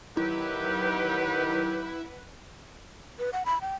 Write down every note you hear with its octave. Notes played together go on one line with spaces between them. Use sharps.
D#3 F#3 E4 G4 B4 F#5
B4
F#5
B5
G5